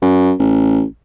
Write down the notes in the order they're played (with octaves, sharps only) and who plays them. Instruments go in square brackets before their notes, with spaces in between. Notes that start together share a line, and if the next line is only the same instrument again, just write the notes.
[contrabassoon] F#2
A1